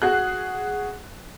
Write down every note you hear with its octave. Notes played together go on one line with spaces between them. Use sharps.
F#4 G#4 F#6